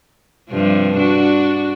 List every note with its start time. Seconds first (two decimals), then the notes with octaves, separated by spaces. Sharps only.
0.50 G2 C3 F3
0.98 D4 F#4